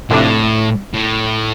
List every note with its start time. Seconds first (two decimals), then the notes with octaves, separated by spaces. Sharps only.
0.10 F2 A2 C3 A3 D4
0.94 A2